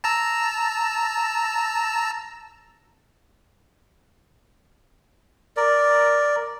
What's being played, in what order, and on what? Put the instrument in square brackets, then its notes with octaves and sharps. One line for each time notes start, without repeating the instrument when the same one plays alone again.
[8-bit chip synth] A5 A#5 E6
[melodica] A#4 D5